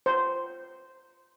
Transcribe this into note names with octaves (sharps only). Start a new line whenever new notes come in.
C5